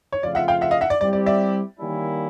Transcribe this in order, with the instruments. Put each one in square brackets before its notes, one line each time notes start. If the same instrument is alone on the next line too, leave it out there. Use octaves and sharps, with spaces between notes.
[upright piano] C#5
[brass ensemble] C#3 F3 A3 C4 F4 [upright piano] D5
[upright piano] E5 F#5
F5 G5
E5 F#5
D#5 F5
E5 F#5
D5
[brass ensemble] G3 C4 E4 G4 [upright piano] D5
[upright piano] D5
D5 E5
[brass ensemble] D#3 G3 A#3 C#4 E4